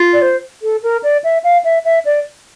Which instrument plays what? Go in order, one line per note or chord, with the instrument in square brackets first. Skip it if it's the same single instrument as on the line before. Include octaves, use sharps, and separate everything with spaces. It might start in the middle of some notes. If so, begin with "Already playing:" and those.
Already playing: [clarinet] F4
[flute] D5
C5
A4
A#4
D5
E5
F5
E5
E5
D5